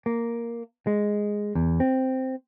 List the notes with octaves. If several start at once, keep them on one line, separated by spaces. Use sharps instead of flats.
A#3
G#3
E2
C4